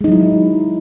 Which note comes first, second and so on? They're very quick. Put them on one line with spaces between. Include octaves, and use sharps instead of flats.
G#3 D#4 F#3 E4